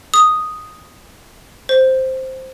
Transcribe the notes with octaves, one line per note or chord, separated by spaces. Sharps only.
D#6
C5